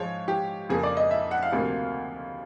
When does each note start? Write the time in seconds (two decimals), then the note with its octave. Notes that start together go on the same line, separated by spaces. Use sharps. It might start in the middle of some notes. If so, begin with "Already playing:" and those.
Already playing: G#2 F3 G#3 C#5
0.28 G4
0.69 F2 C#3 F3 A#3 G#4
0.83 D5
0.97 D#5
1.11 E5
1.31 F#5
1.43 F5
1.52 D2 C3 F3 A#3